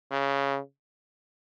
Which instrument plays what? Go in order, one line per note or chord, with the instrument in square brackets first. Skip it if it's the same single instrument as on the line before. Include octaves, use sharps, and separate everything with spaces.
[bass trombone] C#3